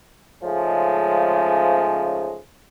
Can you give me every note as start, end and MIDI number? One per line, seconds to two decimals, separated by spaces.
0.43 2.37 44
0.43 2.37 49
0.43 2.37 53
0.43 2.37 56
0.43 2.37 57
0.43 2.37 61